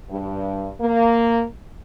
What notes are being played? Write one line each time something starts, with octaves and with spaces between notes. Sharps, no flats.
G2
A#3